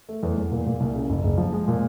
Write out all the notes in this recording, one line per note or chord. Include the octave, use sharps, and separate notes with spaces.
A3
E2
E2
A#2
A#2
C2
C#3
F#1
F#1
F3
G#3
A#2